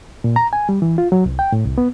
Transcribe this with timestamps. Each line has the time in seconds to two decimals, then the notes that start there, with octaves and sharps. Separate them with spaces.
0.24 A#2
0.36 A#5
0.53 G#5
0.69 G3
0.82 E3
0.98 F4
1.12 F#3
1.26 C2
1.39 G5
1.52 A2
1.65 C2
1.78 B3